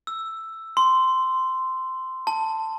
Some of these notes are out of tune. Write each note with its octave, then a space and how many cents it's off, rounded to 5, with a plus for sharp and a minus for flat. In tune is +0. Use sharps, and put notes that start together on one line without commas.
E6 +5
C6 -10
A5 +10